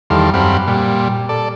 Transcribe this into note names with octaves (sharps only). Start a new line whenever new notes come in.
E2 D#3 G3 A4 F5 C6
F#2 G3 C4 F5 F#5 B5
A#2 G3
A4 D5